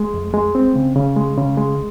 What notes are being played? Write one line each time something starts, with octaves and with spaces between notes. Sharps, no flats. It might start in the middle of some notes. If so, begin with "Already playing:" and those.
Already playing: G#3
F2
G#3
C4
C#3
C#3
G#3
C#3
G#3